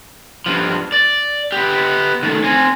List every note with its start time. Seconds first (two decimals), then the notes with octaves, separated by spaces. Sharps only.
0.46 G2 F3
0.92 D5
1.52 B3 G4
2.23 D#3 A3
2.44 C4 G#5